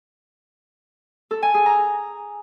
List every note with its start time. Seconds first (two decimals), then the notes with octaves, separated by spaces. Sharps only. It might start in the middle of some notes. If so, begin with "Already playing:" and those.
1.31 A4
1.42 G#5
1.54 G#4
1.66 A#5